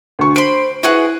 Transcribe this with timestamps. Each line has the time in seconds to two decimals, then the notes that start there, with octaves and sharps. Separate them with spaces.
0.19 D2 C#6
0.36 C5 B5 C6 D7
0.83 E4 F#4 G#4 B4 F#5